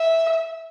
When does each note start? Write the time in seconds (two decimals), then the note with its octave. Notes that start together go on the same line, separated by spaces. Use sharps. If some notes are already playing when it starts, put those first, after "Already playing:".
Already playing: E5